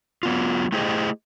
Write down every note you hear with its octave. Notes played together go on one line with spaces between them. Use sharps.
F#3 B3 F4
A3 E4 G4 G#4 C5 D#5